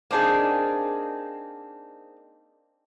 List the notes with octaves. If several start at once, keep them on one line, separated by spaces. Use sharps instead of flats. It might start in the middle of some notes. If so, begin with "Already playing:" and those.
A#3 C4 D4 D#4 G#4